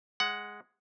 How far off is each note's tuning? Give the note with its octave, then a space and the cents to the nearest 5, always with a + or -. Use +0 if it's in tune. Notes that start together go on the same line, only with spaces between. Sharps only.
G#3 +0 F#5 +5